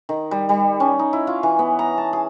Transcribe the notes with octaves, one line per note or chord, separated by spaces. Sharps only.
D#3
G3
G3
C#4
D#4
E4
F4
E3
B3
A#5
A5
G#4